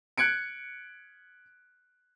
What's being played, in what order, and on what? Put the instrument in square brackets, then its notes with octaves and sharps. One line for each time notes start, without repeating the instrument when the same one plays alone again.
[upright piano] F#6 G#6 C#7 D7